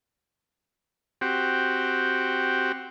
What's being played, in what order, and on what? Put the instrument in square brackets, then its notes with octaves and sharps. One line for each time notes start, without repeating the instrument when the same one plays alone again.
[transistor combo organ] C4 F#4 G4